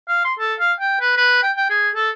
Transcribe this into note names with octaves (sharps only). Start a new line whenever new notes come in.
F5
C6
A4
F5
G5
B4
B4
G5
G5
G#4
A4